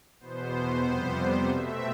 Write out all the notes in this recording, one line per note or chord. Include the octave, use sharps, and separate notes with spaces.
E2 B2 B3 C5
F2 C3 G3 B3
B2 A3 C4 E5